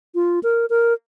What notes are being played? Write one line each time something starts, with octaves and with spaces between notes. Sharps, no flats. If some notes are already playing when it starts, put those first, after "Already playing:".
F4
A#4
A#4